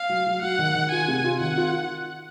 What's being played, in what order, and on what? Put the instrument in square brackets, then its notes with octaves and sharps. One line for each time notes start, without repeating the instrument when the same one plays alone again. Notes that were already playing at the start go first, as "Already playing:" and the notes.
Already playing: [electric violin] F5
[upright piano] F#3
F#3
[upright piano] F#3 [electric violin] F#5
[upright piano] D#3
D#3
[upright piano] F4 [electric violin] G#5
[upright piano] C3
F4
[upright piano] D#3 [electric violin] F#5
[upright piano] F4